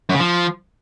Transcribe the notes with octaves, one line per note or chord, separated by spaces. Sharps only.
F#2
C#3
F3